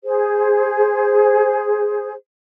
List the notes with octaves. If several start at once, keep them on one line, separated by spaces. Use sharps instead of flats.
G#4 C5